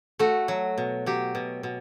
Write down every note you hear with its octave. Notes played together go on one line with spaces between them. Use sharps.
A3 F#4
F#3
B2
F#3 G4
B2
B2